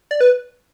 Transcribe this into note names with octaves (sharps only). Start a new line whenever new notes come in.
D5
B4